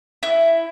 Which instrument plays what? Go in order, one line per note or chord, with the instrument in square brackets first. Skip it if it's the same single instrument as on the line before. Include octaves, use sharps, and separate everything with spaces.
[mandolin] E4